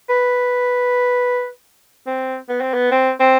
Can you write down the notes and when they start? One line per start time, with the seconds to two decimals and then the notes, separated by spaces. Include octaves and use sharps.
0.10 B4
2.07 C4
2.49 B3
2.61 C4
2.74 B3
2.92 C4
3.20 C4